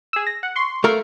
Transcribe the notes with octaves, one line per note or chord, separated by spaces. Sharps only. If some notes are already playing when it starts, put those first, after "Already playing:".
G#4 E6
A#6
F#5
C6 C#6
A3 A#3 A#4